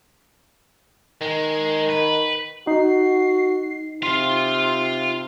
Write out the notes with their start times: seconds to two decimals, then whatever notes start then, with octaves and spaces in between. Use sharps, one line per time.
1.21 D#3 G#3
1.89 B4
2.67 D#4 F#4 C7
4.03 C3 F4 F5 C6